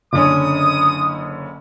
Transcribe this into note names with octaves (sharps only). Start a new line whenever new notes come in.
F#1 D3 C#4 D#6